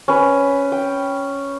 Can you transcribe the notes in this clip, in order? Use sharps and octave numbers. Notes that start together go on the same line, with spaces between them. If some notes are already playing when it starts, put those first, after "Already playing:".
C#4 B4
G5